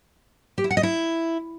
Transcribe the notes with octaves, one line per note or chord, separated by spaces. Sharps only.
G4
E4
F#5
D#5
E4